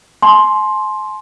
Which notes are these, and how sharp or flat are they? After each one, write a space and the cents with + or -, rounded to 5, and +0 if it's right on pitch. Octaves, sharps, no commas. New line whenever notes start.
G#5 +45 C6 +5